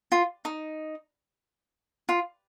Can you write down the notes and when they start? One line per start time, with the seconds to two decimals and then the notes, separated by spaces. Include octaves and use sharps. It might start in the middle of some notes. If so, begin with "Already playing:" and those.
0.12 F4
0.45 D#4
2.09 F4